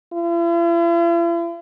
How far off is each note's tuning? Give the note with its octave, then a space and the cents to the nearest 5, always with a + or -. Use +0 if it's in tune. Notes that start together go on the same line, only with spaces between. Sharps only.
E4 +45